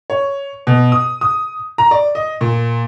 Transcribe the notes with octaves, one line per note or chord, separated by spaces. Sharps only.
C#5
B2
D#6
D#6
A#5
D5
D#5
A#2